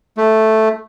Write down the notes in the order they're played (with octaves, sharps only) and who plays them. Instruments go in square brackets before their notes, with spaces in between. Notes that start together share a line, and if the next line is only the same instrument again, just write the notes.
[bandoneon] A3